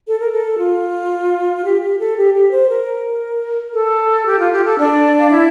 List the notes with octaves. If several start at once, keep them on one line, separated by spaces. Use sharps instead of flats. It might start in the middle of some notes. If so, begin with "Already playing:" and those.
A4
A#4
A4
F4
G4
G4
A4
G4
G4
C5
A#4
A4
G4
F4
G4
A4
D4 D5
F5
E4 E5